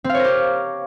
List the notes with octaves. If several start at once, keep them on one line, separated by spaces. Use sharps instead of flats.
C4
F5
C#5
A#4
G4